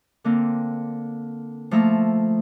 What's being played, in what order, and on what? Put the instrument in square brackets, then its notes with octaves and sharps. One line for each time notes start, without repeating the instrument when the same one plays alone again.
[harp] D3 A#3 C4
F3 A3 A#3 A#5 E6